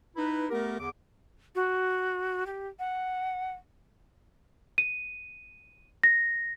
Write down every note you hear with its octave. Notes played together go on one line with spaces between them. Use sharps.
D#4 E4 B4
A3 B3 G4 A#4
E2 D3 D6
F#4
G4
F#5
D#7
A#6